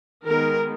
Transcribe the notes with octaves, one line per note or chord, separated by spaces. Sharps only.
D#3 G#3 B3 A#4